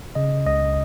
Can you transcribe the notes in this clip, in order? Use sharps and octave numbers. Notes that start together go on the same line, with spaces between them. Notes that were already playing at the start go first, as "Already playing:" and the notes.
C#3 D#5
C#2 D#5